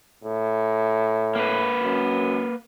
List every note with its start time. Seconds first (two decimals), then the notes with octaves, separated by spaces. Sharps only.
0.24 A2
1.35 A#3 B4
1.82 F#2